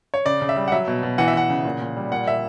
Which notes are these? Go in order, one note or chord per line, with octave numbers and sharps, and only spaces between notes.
C#5
C#3 D5
C#3
E5
G3
F#5
F#3 E5
B2
B2
E3 F#5
E5
E3 F#5
C#3
A#2
A#2
G3
A#2 F#5
A#2 E5